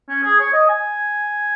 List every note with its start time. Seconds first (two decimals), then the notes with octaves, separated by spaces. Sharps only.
0.09 C#4
0.24 G#4
0.39 C#5
0.53 D#5
0.69 G#5